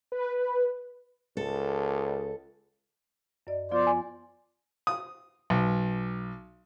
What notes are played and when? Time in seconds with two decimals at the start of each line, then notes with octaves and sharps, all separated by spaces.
0.12 B4
1.37 C#2 A4
3.47 F#2 D5 D#5
3.71 F3 B3 F4 C5 D5
3.87 G#5
4.87 D#6
5.50 B1